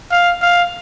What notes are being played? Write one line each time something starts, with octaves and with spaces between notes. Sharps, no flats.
F5
F5